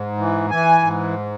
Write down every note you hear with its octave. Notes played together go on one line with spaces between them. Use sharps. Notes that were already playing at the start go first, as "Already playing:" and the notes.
Already playing: G#2
E3
E3 G#5
G#2